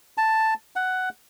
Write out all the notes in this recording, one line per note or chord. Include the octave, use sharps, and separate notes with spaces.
A5
F#5